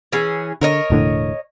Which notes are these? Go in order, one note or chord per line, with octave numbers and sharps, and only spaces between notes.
E3 C#4 G#4
D3 A#4 C#5 D#5
E1 A2 D3